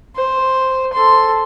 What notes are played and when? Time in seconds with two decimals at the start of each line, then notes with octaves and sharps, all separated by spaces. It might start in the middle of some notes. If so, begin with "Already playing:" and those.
0.16 C5
0.93 A4 C6